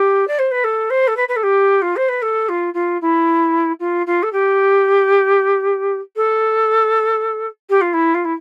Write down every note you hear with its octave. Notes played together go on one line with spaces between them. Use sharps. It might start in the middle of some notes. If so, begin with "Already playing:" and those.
Already playing: G4
D5
C5
B4
A4
C5
A4
B4
B4
A4
G4
F4
C5
B4
A4
F4
F4
E4
F4
F4
A4
G4
A4
G4
F4
E4
F4
E4